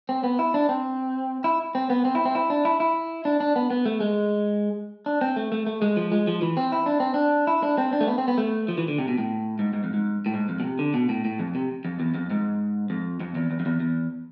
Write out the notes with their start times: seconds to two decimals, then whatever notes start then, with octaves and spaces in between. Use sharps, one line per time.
0.09 C4
0.23 B3
0.39 E4
0.54 D4
0.69 C4
1.44 E4
1.75 C4
1.90 B3
2.05 C4
2.15 E4
2.25 C4
2.35 E4
2.50 D4
2.65 E4
2.80 E4
3.25 D4
3.40 D4
3.56 B3
3.70 B3
3.86 A3
4.00 G#3
5.06 D4
5.21 C4
5.36 A3
5.52 A3
5.67 A3
5.82 G#3
5.97 F3
6.12 G#3
6.27 F3
6.42 E3
6.57 C4
6.72 E4
6.86 D4
7.00 C4
7.14 D4
7.47 E4
7.63 D4
7.78 C4
7.93 D4
8.01 A3
8.08 B3
8.18 C4
8.28 B3
8.38 A3
8.68 F3
8.78 E3
8.88 D3
8.98 C3
9.08 B2
9.18 A2
9.59 G#2
9.74 G#2
9.84 F2
9.94 G#2
10.26 A2
10.34 G#2
10.49 F2
10.60 B2
10.64 C3
10.79 D3
10.94 B2
11.09 A2
11.25 A2
11.39 F2
11.55 C3
11.85 F2
12.00 E2
12.14 F2
12.30 G#2
12.90 F2
13.20 F2
13.35 E2
13.51 E2
13.60 F2
13.66 E2
13.80 E2